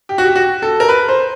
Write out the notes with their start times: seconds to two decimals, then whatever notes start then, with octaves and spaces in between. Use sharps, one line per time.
0.09 G4
0.18 F#4
0.26 G4
0.36 F#4
0.62 A4
0.80 A#4
0.88 B4
1.08 C5